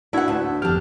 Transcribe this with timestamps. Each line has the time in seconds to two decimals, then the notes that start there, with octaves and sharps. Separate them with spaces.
0.13 D4 E4 F#4 F#5 G#6
0.28 D2 A5
0.62 G1 F2 D4 G4 F6